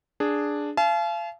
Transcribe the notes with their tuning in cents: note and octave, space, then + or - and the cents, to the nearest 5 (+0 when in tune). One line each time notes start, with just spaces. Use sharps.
D4 +0 G#4 +0
F5 -35 A5 -45